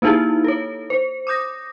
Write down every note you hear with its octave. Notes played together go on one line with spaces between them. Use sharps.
A#3 D#4 E4 G4 G#4
A4 C#5
C5
D6 D#6 G6 A#6